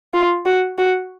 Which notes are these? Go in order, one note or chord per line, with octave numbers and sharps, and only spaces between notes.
F4
F#4
F#4